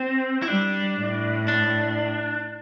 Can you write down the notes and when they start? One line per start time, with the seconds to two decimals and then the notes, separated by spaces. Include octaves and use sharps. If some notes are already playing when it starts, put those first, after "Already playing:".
Already playing: C4
0.42 E4
0.47 G3 D4
0.98 A2
1.48 D4